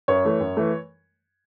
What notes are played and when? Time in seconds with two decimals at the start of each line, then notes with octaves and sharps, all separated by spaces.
0.08 F#2 C#5
0.24 E3 A3
0.40 F#2
0.57 E3 A3